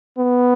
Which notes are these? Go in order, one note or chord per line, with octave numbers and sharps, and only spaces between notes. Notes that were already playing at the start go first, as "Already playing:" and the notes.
B3